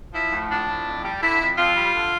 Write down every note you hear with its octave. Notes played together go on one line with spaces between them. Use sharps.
F3 E4
A2
F3 D4
A2
F2
G3
D3 E4
F2
F2 F4
G3
D3